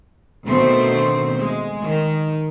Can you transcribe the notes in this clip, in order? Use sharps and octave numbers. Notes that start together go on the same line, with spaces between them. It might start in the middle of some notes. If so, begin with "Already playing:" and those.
D2 B2 D#3 A3 C4 C5
G#3
D#3